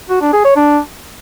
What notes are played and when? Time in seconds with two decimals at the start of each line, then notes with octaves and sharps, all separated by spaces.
0.10 F#4
0.21 D4
0.33 G#4
0.44 C#5
0.56 D4